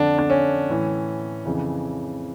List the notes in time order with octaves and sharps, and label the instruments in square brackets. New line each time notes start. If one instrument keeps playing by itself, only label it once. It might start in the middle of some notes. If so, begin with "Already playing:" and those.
Already playing: [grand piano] F2 D3 D4
D4
C#4
A2 E3
F2 C#3 E3